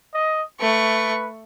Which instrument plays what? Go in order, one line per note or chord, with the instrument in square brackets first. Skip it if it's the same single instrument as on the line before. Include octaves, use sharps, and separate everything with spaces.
[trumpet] D#5
[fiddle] A3 C#6 [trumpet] B4